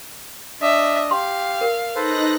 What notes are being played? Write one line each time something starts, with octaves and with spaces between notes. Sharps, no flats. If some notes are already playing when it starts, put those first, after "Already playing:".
D4 D#5 E5
G4 F5 C6
A#4
D#4 A4 B4 C5 F#6 A#6